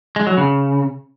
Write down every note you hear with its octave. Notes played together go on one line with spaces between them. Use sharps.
G#3
F#3
C#3